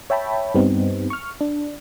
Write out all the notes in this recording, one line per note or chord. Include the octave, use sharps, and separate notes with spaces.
C#5 E5 G5 A5 B5
G2 G3 B3 C4 D#4
C#6 F6
D4